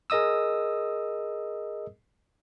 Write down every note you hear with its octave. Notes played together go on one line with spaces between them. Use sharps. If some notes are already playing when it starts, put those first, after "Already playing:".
G#4 A#4 D#5 D#6 E6